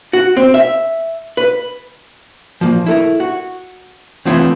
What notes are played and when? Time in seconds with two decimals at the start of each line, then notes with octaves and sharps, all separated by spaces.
0.13 F#4
0.37 C4
0.54 E5
1.37 B4
2.61 F3 A#3
2.86 E4 A4 A#4
3.20 F#4
4.25 E3 A3 B3 C4 F4 C#5